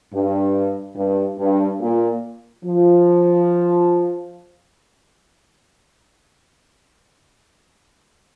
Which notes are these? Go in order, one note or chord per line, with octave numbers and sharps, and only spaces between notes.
G2
G2
G2
A#2
F3